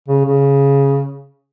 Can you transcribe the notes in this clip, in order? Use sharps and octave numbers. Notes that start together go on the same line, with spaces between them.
C#3
C#3